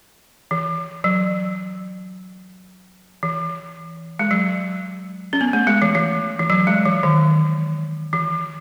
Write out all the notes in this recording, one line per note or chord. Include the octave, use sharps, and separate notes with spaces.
E3
F#3
E3
G#3
F#3
C#4
B3
A3
G#3
E3
E3
E3
F#3
G#3
E3
D#3
E3